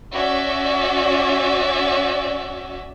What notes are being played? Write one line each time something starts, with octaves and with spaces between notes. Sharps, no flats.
C#4 F#4 D5 E5